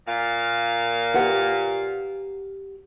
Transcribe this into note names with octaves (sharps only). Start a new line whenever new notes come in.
A#2 F5
G4 B4 F#5